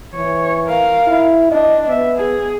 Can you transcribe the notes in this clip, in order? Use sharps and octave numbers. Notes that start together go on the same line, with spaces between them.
E3 C#5
A#4 F5
E4
D4 D#5
B3 E5
G#4